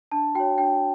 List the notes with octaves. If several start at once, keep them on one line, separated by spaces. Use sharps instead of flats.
D4 A5
F#4 C#5 G5
D4 G5